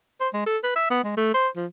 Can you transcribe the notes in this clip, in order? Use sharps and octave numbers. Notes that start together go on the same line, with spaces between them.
C5
G#3
A4
B4
E5
B3
G#3
A3
C5
F3